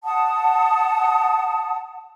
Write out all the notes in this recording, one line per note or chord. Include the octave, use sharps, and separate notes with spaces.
F#5 A5 D#6